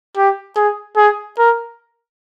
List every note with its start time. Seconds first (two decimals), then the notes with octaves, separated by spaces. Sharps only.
0.17 G4
0.56 G#4
0.97 G#4
1.38 A#4